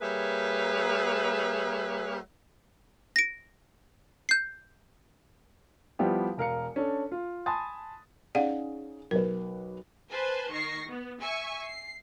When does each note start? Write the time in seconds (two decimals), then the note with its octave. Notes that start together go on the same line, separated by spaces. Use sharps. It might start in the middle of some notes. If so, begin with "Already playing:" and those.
0.02 G3 A#3 G#4 B4 C#5 E5
3.16 A#6 D7
4.29 G6 C7
5.99 F3 G3 B3 E4 G4
6.37 E1 A#4 F5 C#7
6.76 C#4 D4 A4
7.12 F4
7.46 G#5 A5 B5 C6 D#6 A6
8.35 C#4 D#4 G#4 D5 F5 F#5
9.11 B1 A#4 B4
10.11 B4 C5 G#5 A5
10.52 D#3 C#6 A#6 C7
10.88 B3
11.21 E5 G#5 C#6
11.64 C7